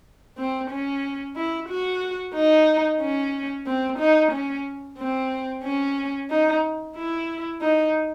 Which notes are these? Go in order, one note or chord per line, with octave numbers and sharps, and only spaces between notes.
C4
C#4
E4
F#4
D#4
C#4
C4
D#4
C#4
C4
C#4
D#4
E4
D#4